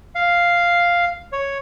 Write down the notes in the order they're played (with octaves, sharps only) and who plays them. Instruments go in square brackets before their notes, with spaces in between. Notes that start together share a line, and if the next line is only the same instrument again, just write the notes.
[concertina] F5
C#5